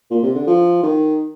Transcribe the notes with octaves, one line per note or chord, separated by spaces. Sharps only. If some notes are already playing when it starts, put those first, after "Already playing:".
A#2
C3
D3
F3
D#3